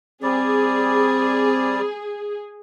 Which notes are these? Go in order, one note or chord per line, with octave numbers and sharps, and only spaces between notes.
G3 C4 G#4 D5